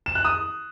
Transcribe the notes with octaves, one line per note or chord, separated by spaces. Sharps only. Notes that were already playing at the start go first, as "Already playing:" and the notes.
E7
F#6
D#6